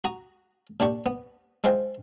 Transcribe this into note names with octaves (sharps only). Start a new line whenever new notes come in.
F#4 A#5 D#6
A#2 D4 G4 C#6
B3
G#3 E4 F4 C5 G5